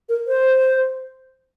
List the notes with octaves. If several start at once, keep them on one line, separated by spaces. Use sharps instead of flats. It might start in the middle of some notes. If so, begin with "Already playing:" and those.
A#4
C5